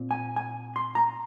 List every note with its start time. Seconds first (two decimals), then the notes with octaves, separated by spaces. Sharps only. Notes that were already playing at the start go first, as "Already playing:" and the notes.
Already playing: A#2 C4
0.11 G#5
0.36 G#5
0.76 C6
0.95 A#5